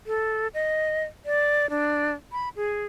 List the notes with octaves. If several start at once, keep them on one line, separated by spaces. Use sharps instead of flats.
A4
D#5
D5
D4
B5
G#4